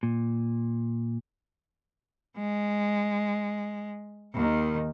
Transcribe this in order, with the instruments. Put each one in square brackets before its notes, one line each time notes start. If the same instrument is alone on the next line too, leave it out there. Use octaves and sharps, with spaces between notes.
[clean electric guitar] A#2
[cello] G#3
D#2 D#3